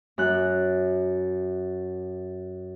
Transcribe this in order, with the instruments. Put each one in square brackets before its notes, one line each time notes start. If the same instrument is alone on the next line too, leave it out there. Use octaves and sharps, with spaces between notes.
[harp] F#2 F#6